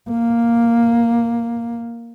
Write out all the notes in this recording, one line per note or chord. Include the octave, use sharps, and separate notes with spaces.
A#3